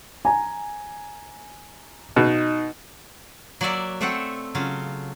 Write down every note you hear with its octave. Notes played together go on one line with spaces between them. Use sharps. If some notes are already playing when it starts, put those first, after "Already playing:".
G#5 A#5
B2 D#4
F#3 A#3 F#4 D5 E5
A3 C4 A4 E5 F#5 G5
C#3 F#3 F4